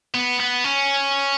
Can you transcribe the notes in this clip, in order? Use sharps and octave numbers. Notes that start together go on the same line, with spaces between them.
B3
B3
C#4